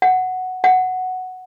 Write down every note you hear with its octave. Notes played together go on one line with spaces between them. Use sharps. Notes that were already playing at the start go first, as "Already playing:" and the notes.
F#5
F#5